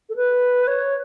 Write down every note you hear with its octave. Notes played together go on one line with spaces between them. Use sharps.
A4
B4
C#5